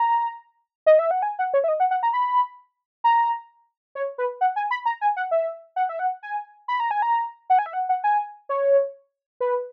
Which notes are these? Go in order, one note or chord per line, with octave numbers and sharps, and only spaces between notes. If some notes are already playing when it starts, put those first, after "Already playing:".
Already playing: A#5
D#5
E5
F#5
G#5
F#5
C#5
E5
D#5
F#5
F#5
A#5
B5
A#5
C#5
B4
F#5
G#5
B5
A#5
G#5
F#5
E5
F#5
E5
F#5
G#5
B5
A#5
G#5
A#5
F#5
G#5
E5
F#5
F#5
G#5
C#5
B4